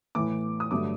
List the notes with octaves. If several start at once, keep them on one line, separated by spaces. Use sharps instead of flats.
A2 E3 A3 D6
D#6
G2 D3 F#3 A3 D6